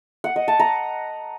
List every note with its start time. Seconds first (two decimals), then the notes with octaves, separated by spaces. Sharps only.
0.24 F#5
0.36 D#5
0.48 A5
0.60 A#5